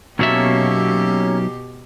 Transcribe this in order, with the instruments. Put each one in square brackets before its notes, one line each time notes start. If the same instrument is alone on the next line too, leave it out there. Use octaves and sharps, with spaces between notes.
[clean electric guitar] B1 F#3 E5 [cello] B2 G4 [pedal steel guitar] A#3 C#4 A4